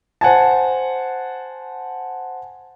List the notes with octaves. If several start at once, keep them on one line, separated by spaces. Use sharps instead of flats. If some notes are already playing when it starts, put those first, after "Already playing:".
C5 F#5 G#5 A5